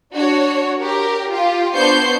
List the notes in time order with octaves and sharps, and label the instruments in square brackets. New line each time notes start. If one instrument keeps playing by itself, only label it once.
[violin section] D4 F#4 C#5
G4 A#4
F4 G4
B3 D4 C5 C#6 G6 C7